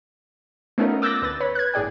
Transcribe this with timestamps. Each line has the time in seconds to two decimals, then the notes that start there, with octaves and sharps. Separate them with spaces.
0.78 A3 B3 C#4 D#4 F4 A#4
1.02 D6 E6 F#6 G6 A6 A#6
1.22 D2 B4 A6
1.40 B4 C#5 B5
1.55 F#6 G#6
1.74 G1 A2 G#4 D5 G5